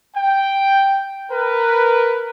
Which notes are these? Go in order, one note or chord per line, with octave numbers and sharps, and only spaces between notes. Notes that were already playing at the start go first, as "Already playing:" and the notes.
G5
A#4 B4